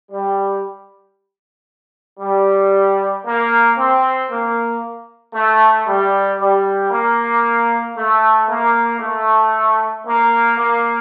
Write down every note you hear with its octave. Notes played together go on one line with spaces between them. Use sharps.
G3
G3
A#3
C4
A#3
A3
G3
G3
A#3
A3
A#3
A3
A#3
A#3